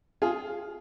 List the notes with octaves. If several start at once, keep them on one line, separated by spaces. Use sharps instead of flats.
F4 G#4